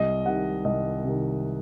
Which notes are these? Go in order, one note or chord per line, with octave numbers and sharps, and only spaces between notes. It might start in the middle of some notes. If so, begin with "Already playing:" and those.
Already playing: C2 D#5
C3 D#3 F#5
C2 D#5
C3 D#3